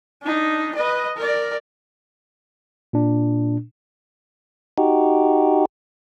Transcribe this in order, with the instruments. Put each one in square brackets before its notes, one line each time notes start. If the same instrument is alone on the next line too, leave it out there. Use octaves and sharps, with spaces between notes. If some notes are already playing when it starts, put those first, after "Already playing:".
[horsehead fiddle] D4 D#4
B4 D#5
A#4 D5
[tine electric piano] A#2 D4
[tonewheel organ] D#4 F#4 G4